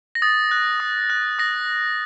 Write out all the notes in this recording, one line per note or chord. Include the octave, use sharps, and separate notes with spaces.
A#6
D#6 A6
F#6
D#6
F#6
D#6 A#6